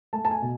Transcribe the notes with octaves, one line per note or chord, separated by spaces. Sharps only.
A3 A5
A5
G#5
B2